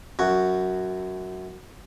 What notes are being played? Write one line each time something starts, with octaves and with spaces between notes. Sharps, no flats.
F#2 F#4